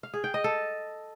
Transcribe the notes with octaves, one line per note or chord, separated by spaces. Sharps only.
F5
G#4
G5
D#5
A4